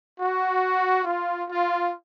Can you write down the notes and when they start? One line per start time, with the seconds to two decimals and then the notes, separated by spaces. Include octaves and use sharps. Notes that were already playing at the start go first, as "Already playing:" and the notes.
0.19 F#4
1.05 F4
1.48 F4